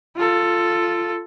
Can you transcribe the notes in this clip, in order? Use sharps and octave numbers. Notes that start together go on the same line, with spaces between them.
F4 A4